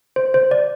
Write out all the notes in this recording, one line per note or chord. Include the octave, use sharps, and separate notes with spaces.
C5
C5
D5